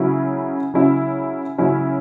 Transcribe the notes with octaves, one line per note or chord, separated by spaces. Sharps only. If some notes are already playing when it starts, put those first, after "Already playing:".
Already playing: C#3 F#3 C#4 E4
C#3 F#3 C#4 E4
C#3 F#3 C#4 E4